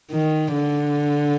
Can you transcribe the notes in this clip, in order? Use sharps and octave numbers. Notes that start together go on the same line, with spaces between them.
D#3
D3